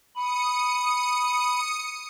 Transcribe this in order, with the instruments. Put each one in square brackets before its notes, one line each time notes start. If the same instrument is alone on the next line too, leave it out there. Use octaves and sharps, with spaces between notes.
[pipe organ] B5 [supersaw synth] D#6 C#7